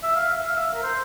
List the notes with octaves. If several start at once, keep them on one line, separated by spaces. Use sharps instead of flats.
E5
F5
E5
F5
E5
A#4
C5